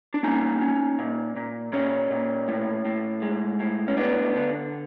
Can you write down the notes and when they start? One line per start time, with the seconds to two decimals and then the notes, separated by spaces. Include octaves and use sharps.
0.14 D4
0.23 A#3 C#4 D#4
0.61 C#4
0.99 A#2
1.36 A#2
1.73 A#2 C#4
2.11 A#2
2.48 A2
2.85 A2
3.22 G#3
3.60 A2
3.88 C#4
3.97 B3 D4
4.35 D3